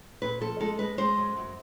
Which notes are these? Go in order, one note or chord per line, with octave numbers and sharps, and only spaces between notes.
A#2 B4
F3 A4
G#3 A4
G#3 B4
G#3 C5
F#2
F#2